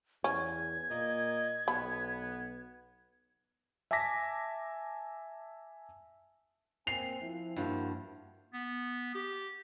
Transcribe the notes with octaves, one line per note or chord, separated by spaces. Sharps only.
E2 C#4 G#6
A#2 A#3 D#5
B1 B3 B5
E5 G#5 A5 D6 A#6 B6
A#3 C4 G#5 C7 F7
F3 E4
G2 F3 A#3 F#4
B3
G4